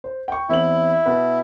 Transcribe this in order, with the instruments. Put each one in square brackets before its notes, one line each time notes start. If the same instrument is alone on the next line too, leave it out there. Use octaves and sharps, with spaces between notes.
[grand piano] C5
G5 C#6
[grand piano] E2 C4 F#7 [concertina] E4
[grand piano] B2 B4